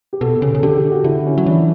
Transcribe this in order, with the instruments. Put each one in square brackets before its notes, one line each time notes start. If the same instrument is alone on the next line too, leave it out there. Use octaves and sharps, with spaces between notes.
[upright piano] G4
[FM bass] B2 [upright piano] A4
[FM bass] C#3
C#3
[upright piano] A4
[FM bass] D3 [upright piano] G4
[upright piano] G4
F#4
[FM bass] D3 [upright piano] E4
[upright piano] C#4
[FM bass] F#3
[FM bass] E3 [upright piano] D4